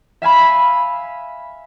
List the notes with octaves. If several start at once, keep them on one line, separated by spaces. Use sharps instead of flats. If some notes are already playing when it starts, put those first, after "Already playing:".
E5 F5 G#5 B5